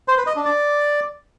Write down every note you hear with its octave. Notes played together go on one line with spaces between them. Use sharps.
C5
B4
D#5
D4
D5